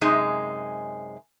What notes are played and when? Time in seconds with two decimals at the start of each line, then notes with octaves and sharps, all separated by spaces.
0.01 F#2 C3 G#3 D#4 G#4